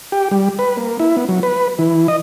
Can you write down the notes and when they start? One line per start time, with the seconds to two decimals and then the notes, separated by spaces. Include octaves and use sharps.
0.12 G4
0.31 G3
0.59 B4
0.77 A#3
0.99 E4
1.16 B3
1.29 F#3
1.43 B4
1.79 E3
2.08 D#5